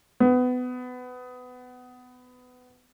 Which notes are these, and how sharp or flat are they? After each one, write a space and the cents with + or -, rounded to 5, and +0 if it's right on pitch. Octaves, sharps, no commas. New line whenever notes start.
B3 +20